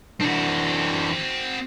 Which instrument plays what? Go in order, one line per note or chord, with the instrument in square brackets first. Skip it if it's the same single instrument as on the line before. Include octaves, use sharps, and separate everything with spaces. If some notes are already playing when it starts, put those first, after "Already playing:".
[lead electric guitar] E3 D4 [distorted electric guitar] C4 F#4